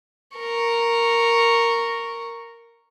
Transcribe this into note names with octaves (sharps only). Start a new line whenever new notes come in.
A#4 C#6